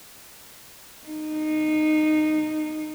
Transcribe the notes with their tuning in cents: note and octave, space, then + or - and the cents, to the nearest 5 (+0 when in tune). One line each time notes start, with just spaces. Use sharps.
D#4 -15